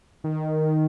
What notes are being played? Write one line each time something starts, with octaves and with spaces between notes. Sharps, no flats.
D#3